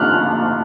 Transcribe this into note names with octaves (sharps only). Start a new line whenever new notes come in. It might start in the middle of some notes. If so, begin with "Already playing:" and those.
Already playing: F6 F#6